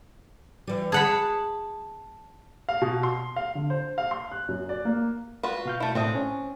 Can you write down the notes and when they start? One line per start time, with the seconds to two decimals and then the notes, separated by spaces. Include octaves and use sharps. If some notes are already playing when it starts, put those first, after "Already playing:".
0.67 E3 G3
0.92 G#4 F#5 A5 B5
2.69 F5
2.81 B2
3.03 C6
3.36 F5
3.55 D3
3.70 C5
3.98 F5
4.11 C6
4.32 F#6
4.49 F#2
4.69 D5
4.85 A#3
5.43 F4 F#4 B4
5.66 B2 F5 G6
5.80 A3 E4
5.95 A2 C4 D4 E5 D#6
6.15 C#4